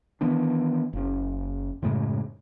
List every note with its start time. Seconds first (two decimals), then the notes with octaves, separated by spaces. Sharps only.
0.21 D#3 E3 B3 D4
0.93 F#1 C#4
1.82 F#2 A2 C#3 G#3